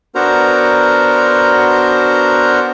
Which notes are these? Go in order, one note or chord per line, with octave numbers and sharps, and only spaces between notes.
B3 D4 F#4 A#4 C5 A#5